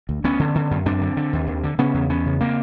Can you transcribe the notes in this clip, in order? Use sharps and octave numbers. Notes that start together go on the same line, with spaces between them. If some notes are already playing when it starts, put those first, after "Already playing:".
D2
D2 B3 C#4
D3
D3
F#2
F#2 C4 D4
D3
D3
D#2
D#2
D3
C#3 B3 C#4
E2
E2 B3 C#4
C#3
C#3 A#3 C4